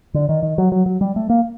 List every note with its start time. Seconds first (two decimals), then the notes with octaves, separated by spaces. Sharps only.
0.14 D3
0.29 D#3
0.43 D#3
0.58 F#3
0.72 F#3
0.86 F#3
1.01 G3
1.16 A3
1.30 A#3